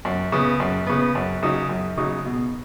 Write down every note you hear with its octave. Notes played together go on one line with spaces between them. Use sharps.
F#2
C#3 B3
F#2
C#3 B3
F#2
C#3 F#3 D#4
F#2
C#3 F#3 D#4
B2